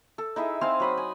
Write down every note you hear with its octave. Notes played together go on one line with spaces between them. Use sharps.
A4
D#4 E4 G#4 E5
C4 G#4 C5 F5
F#3 B5 D#6
G#5